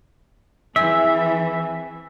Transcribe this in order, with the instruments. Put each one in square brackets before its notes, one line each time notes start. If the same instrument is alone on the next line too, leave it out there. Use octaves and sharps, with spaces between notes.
[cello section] E3 [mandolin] C4 G#4 [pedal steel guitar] E5